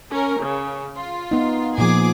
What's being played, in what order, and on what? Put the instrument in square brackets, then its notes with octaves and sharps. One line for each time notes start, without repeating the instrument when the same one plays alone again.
[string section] C#4 A#4
C#3
F4
[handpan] B3 D#4
[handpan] A#2 F3 [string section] G#4 D6